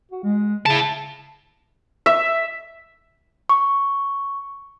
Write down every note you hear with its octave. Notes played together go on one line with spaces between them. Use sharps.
F#4
G#3
C#3 E4 A5
E5
C#6